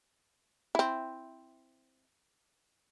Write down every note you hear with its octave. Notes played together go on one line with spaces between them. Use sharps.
C4 E4